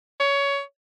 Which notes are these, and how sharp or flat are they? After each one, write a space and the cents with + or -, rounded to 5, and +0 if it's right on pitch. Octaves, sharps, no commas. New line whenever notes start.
C#5 +20